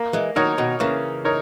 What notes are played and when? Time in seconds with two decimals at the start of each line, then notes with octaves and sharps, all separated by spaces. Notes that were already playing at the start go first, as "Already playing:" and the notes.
Already playing: A#3
0.13 E3 G#3
0.36 D#3 F#3 D#4 A#4 C#5
0.58 B2 D#3
0.80 C#3 E3 A#3
1.25 D#4 A#4 C#5